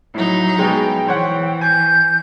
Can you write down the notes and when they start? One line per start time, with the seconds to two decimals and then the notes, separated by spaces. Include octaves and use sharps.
0.14 A2 F#3 D#4
0.59 B2 G#3 G5
1.07 E3 C5 C#5 F#5
1.61 G#5 G6